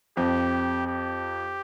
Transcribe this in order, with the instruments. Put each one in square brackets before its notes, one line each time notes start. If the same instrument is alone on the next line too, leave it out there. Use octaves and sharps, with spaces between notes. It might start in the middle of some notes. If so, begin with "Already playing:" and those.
[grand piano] F2 [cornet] G4
[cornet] G4